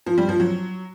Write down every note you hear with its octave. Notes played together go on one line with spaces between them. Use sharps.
F3
G3
F3
F#3